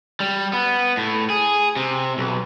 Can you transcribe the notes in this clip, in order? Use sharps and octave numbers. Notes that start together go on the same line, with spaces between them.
G3
B3
A2
G#4
C3
B1